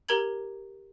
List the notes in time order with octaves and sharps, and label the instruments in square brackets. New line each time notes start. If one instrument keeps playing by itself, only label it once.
[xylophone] G4 A#4 A#5 G#6 F#7